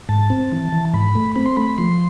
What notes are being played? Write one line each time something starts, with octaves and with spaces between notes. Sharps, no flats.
G#2 A5
C4
E3
E3
G#2 B5
A3
C4 B5
C6
A3 B5
F3 C6